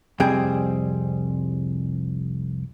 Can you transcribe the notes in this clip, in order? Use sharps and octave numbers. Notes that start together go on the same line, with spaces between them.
C2 F2 G3 C4 G#4 G5